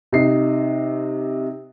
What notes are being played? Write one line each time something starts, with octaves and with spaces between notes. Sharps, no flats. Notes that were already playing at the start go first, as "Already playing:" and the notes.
C3 D#4 C7